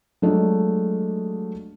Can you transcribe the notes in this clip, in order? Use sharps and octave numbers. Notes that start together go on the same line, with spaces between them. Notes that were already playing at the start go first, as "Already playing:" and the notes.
F#3 G#3 A3 D4 F4 D#5